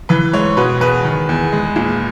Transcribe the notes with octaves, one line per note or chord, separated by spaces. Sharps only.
E3 B4
G#2 C#5
B2 B4
E2 B4
D#3
E2
G#3
A#2